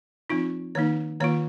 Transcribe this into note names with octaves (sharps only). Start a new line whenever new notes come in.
F3 C4 D#4 F4
D#3 A#3 D#4 C#5
D#3 A#3 F4 C#5